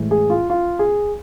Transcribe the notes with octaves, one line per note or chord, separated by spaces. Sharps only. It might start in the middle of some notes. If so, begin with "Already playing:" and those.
Already playing: A2 E3 G#3
G#4
F4
F4
G#4